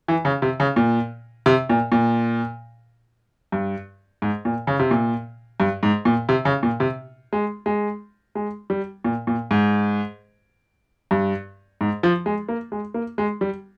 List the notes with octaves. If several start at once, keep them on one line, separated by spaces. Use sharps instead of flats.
E3
C#3
C3
C#3
A#2
C3
A#2
A#2
G2
G#2
A#2
C#3
C3
A#2
G2
G#2
A#2
C3
C#3
A#2
C3
G#3
G#3
G#3
G3
A#2
A#2
G#2
G2
G#2
F3
G#3
A#3
G#3
A#3
G#3
G3